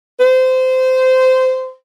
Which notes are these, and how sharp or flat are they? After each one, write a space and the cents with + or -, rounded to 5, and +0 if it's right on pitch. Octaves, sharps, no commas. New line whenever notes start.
C5 -20